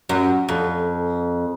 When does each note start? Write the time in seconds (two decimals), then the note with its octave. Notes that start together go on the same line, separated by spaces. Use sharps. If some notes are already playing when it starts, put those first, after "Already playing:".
0.09 F#2
0.49 F2